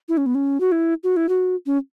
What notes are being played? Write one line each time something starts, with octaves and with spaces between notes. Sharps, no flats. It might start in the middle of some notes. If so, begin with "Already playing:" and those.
E4
C#4
B3
C#4
F#4
E4
F#4
E4
F#4
C#4